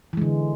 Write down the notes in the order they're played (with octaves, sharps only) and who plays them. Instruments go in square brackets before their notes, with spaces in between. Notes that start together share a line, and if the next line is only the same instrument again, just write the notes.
[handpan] E3
G#3
D3